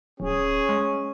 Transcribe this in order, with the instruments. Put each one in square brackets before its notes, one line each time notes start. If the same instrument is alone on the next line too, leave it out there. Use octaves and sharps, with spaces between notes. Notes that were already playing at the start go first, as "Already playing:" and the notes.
[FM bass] D1 [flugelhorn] C#4 [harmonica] G#4
[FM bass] G#3